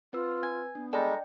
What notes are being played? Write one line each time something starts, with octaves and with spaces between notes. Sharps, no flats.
C4 F4 B4 E6
G#5
B3 D4
G3 G#3 A4 D5 D#5 G5 A#5